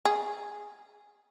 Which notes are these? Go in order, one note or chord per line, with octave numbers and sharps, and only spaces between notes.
G#4